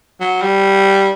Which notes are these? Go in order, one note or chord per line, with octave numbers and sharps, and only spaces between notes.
F#3
G3